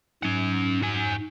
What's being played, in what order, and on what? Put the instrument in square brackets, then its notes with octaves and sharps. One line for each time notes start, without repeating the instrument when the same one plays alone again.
[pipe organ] G#2 [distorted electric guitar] C#4 F#5
[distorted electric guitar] F#4 G#5